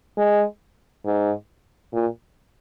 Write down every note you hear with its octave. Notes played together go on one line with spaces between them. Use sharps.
G#3
G#2
A#2